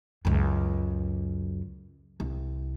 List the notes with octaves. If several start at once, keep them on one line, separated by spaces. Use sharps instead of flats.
C#2 F#2
C2